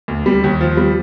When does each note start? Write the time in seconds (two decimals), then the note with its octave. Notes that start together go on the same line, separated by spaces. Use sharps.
0.08 D2
0.26 G3
0.44 D#2
0.61 F3
0.77 G3